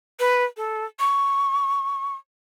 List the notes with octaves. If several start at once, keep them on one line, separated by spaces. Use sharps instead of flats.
B4
A4
C#6